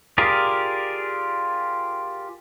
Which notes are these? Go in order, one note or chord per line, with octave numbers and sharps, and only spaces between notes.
F4 G4 G#4 A#4 D5